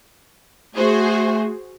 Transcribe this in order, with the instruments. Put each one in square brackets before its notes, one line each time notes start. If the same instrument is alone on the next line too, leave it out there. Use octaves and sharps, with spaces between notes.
[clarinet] A3 [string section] F#4 G#4 C5